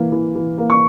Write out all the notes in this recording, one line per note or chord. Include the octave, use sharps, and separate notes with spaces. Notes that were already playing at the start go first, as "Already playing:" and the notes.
Already playing: E3 A#3
E3
E3
A#3
C#6